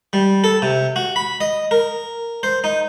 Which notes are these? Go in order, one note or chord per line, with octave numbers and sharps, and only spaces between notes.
G3
A4
C3
F#4
B5
D#5
A#4
C5
D#4